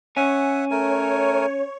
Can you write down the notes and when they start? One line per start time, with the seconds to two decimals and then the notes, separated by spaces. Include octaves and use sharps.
0.17 C#4 E5 F#5 G#5
0.71 A3 A#4 C#5 G#5